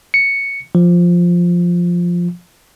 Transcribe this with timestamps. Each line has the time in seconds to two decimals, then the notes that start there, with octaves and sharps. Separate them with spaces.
0.14 C#7
0.75 F3